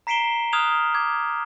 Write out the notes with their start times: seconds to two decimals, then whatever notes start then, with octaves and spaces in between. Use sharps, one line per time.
0.07 A#5 B6 C7 D7 E7 G7
0.53 D#6 F6 F#6 G#6 E7 F7
0.95 D6 G#6